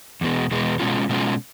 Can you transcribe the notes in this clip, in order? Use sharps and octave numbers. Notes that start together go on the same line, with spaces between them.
E2 B2 G#3
E2 B2 G#3
B2 G#3 C#4 F4
B2 G#3 C#4 F4